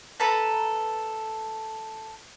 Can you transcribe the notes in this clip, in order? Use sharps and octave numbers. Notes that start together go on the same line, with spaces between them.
A4 B4 A5 A#5